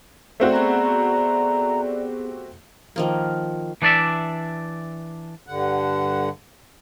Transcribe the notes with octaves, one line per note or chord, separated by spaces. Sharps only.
A3 B3 C4 F#4 D5
B3 G#4 A#5
G4
D#3 F3 A#3
E3 D4 D5 E5
G2 D3 F#5